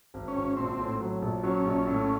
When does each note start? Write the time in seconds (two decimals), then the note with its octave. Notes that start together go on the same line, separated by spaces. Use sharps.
0.14 G#1
0.28 C#4
0.36 G#1
0.57 A#1 C4
0.79 A2
1.01 F#3
1.22 A#1
1.43 F#3 C#4
1.65 A#1
1.87 A2